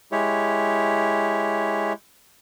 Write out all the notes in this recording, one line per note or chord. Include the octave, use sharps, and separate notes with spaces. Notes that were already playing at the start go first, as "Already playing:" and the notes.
G#3 E4 G4 C#5